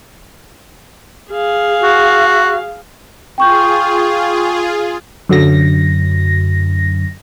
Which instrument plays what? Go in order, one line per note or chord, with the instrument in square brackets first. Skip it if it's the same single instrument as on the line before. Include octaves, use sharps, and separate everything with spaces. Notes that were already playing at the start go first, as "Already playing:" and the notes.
[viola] G#4 F5
[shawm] F#4
[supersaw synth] F4 G#4 [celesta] G5 C#6 G6
[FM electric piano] F#2 D3 F#3 A#6